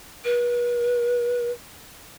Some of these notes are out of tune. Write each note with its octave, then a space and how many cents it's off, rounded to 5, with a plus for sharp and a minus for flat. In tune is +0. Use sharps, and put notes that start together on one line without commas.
B4 -40